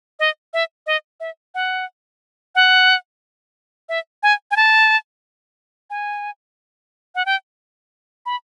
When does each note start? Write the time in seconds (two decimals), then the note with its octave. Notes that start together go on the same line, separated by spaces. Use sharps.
0.20 D#5
0.54 E5
0.87 D#5
1.20 E5
1.55 F#5
2.55 F#5
3.89 E5
4.23 G#5
4.51 G#5
4.56 A5
5.90 G#5
7.15 F#5
7.26 G5
8.26 B5